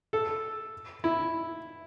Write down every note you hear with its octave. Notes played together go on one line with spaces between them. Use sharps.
A4
E4